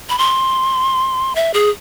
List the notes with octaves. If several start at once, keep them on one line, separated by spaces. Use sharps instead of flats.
B5
C6
E5
G#4